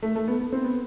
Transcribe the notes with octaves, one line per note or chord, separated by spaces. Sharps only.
A3
A3
B3
B3
C4
B3